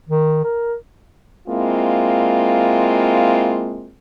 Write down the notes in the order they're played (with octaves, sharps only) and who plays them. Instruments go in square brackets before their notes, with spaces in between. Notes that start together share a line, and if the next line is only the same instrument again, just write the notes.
[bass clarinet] D#3
A#4
[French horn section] G#3 A#3 C4 E4 F4